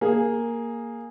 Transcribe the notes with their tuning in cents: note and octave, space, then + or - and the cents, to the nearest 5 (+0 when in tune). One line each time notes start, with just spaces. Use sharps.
A#3 +0 G#4 +0